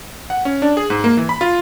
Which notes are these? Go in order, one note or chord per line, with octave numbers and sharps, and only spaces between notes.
F#5
C#4
D4
G#4
G#2
A#3
E3
B5
F4